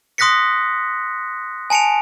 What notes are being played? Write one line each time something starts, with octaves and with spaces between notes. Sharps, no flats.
C6 D#6 F#6 A#6 B6 C#7
G#5 A5 C#7 D7 F7